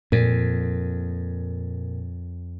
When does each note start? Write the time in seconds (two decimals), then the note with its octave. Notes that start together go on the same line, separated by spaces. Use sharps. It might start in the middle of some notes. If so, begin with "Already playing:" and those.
0.12 F2 A#2